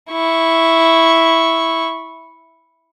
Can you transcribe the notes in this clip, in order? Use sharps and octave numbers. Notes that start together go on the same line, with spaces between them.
E4 C#6